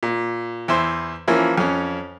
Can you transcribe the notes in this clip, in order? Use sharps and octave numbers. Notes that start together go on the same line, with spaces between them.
A#2
E2 E4 C5
E3 F3 A#3 C#4 E4
F2 C#4